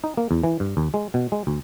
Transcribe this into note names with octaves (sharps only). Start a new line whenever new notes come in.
D#4
A#3
E2
E3
G2
D#2
G#3
B2
G#3
D2